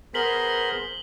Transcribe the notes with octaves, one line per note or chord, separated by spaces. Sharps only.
B3 G#4 A#4 C5 B6 F#7 G7